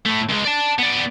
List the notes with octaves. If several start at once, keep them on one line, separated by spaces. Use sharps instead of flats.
A2 A3
C#2 G#3
D5 A5
B3 D5